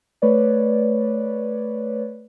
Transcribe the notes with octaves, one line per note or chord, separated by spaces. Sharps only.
A3 B4 C#5 D5